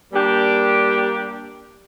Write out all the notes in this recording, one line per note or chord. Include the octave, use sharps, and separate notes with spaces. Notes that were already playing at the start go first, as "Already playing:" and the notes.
G3 A#3 D4 G4